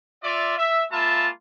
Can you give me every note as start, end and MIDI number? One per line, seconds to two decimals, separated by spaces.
0.23 0.57 65
0.23 0.57 74
0.23 0.57 76
0.58 0.85 76
0.91 1.29 56
0.91 1.29 58
0.91 1.29 65
0.91 1.29 76
0.91 1.29 81
0.91 1.29 83